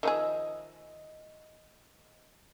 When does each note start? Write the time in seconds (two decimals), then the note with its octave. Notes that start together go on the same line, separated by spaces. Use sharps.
0.03 D#3 F3 G#4 D#5 E5